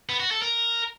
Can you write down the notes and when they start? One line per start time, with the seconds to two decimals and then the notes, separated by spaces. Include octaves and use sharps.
0.09 B3
0.20 F#4
0.31 A4
0.42 A#4